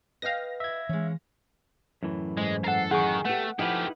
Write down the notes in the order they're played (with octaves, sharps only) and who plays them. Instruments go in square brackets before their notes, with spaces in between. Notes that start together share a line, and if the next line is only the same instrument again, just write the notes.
[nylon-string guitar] B4 D#5 G5 [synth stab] F5 A#6
[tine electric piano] E5 G#6
[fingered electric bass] E3 [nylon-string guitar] G#3 C#4
[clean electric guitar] F#2 A2 E3
[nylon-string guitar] G#2 [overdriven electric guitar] G#3
[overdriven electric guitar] A4 A#4 [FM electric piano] F#5 C7
[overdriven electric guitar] D#3 [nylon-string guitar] G#4 [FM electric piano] F#5 C#6
[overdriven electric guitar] A3 [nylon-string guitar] B3 G4 [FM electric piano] F#5
[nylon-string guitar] F3 [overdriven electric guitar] A3 G4 [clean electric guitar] D#4 E4 B4